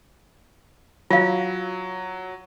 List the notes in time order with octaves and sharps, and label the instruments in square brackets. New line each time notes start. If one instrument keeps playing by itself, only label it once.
[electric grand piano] F#3 [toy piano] F4 F5